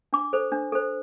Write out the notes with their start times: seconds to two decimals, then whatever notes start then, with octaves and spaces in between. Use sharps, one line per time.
0.13 D4 D6
0.33 A4 C5
0.52 D4
0.72 A4 C5